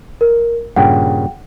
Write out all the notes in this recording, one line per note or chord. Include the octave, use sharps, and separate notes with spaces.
A#4
G2 A#2 C#3 F#5 G5